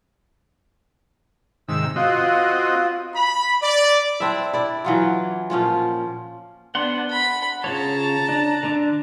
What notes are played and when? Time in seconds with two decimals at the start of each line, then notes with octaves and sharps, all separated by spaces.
1.69 G#2 C3 D#3 E6
1.96 C4 F4 F#4 D#5
3.14 B5
3.62 D5
4.20 C4 D4 E4 E5
4.53 E4 D5
4.84 E3 F#3 F4
5.50 A#2 F3 C#4 F4
6.75 B3 D4 F#5 C6
7.11 B5
7.64 C#3 F4 C#5 A5 A#5
8.29 D4
8.63 D3 D4